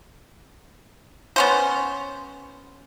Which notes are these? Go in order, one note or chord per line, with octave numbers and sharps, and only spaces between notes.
B3 C#4 C5